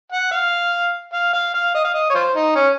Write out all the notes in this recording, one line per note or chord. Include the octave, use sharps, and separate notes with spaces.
F#5
F5
F5
F5
F5
D#5
F5
D#5
C#5
F4 C5
D#4
C#4